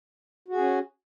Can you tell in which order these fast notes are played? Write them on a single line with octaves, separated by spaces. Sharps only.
F#4 G#4 C#4